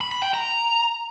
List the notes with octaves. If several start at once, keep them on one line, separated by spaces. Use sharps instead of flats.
B5
B5
G5
A#5